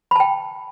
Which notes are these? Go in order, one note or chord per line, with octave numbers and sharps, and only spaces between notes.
G5 A5 B5